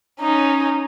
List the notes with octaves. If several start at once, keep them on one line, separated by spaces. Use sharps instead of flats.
C#4 D#4